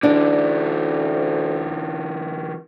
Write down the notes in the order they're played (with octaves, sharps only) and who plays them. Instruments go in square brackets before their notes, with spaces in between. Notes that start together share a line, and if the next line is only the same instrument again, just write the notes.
[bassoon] D2 [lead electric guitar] D3 E3 [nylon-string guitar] D4